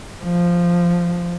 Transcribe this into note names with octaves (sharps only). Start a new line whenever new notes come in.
F3